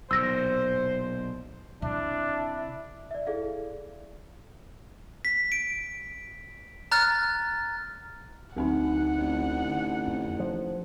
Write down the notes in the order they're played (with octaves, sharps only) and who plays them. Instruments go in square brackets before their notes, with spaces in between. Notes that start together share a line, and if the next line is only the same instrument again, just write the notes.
[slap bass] B1 A#2 [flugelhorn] C5 [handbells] E6 A#6
[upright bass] C3 [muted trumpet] D4 [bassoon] E4
[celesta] D5 E5
E4 G#4 A4 D5 F5
[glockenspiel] B6
D7
A#5 F6 F#6 A6
[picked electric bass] D2 [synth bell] D3 C4 D#4 [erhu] F#5
[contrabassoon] A1
[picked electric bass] F2
F3